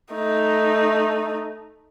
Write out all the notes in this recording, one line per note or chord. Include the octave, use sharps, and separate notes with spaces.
A3 D#4